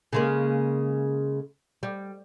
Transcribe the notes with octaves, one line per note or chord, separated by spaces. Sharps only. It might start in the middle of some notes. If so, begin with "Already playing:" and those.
C#3 G#3 A#3
G3